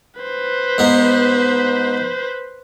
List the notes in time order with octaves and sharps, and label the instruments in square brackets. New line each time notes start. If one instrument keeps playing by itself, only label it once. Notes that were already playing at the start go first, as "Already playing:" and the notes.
[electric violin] B4 C5
[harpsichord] G#2 B3